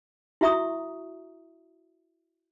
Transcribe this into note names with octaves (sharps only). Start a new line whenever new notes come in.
E4 F#4 E5 A#5 C#6 D#6